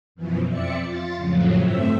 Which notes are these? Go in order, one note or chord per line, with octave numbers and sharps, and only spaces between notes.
F#2 B2 E3 F3
F2 C4 D5 E5 C#7
F4 A6
F2 A2 C#3 F3 F#3
G2 A3 C4 E5